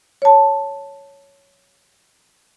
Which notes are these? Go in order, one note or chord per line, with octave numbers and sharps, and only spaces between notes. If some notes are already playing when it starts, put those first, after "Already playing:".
C#5 A5